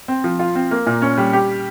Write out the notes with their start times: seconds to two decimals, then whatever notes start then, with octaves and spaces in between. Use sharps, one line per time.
0.08 C4
0.24 F3
0.39 F4
0.55 C4
0.71 A#3
0.87 A#2
1.02 C#4
1.18 G3
1.33 G4